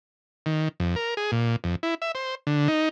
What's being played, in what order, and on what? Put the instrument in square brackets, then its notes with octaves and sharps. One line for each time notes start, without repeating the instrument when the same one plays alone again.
[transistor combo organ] D#3
F2
A#4
G#4
A#2
F2
E4
E5
C5
D3
D#4